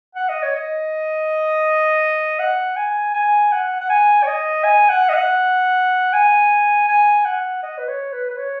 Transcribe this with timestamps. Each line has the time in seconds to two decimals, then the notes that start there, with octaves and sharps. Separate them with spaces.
0.15 F#5
0.29 D#5
0.43 C#5
0.56 D#5
2.39 F#5
2.77 G#5
3.14 G#5
3.52 F#5
3.81 F#5
3.90 G#5
4.23 C#5
4.27 D#5
4.64 G#5
4.89 F#5
5.09 D#5
5.14 F#5
6.13 G#5
6.89 G#5
7.25 F#5
7.63 D#5
7.78 B4
7.88 C#5
8.13 B4
8.30 B4
8.37 C#5